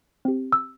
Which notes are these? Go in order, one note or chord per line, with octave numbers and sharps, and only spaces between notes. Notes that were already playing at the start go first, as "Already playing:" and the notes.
C4 G4
E6